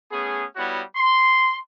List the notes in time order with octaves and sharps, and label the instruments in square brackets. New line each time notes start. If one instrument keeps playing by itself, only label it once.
[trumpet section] A3 B3 C#4 G#4
G3 B3 E4 F#4 C#5 F#5
C6